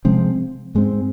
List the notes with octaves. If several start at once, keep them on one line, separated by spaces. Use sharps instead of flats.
C3 F3 G#3 C4
G#2 G#3 C4